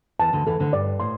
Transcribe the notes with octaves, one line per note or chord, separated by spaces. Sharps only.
E2 E3 A5
D2 D3
E2 E3 A4
D2 D3
G2 D5
A2 C6